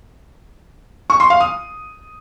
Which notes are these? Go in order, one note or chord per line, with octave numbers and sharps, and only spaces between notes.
C#6
C6
F5
D#6